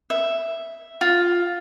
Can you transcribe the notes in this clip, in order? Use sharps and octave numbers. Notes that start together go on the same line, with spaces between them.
E5
F4